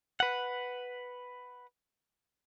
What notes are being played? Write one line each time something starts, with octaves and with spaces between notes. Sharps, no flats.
B4 F#5